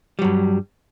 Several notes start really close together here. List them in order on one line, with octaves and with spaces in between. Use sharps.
G3 F#3 G2